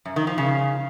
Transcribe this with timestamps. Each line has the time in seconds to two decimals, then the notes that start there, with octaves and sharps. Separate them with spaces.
0.05 F#2
0.16 D#3
0.27 F3
0.38 C#3